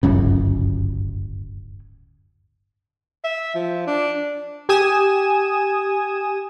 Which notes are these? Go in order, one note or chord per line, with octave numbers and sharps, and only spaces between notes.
D1 G1 F#2 C#3
E5
F3
D4
G4 G#5 D#6 E7